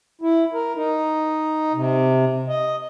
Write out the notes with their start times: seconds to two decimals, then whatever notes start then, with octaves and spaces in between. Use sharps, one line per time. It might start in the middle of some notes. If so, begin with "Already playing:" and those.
0.22 E4
0.54 A#4
0.77 D#4
1.74 C3
2.48 D#5